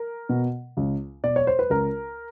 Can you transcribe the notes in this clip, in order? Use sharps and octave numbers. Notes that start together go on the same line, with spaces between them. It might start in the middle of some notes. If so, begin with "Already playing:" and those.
Already playing: A#4
B2
C#2
B2 D5
C#5
C5
B4
C#2 A#4